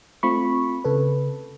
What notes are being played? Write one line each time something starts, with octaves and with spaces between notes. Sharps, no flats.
A3 C4 F4 B5 C#6
C#3 A4 B4